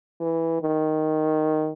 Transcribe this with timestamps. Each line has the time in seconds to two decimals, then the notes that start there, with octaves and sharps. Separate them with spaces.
0.21 E3
0.61 D#3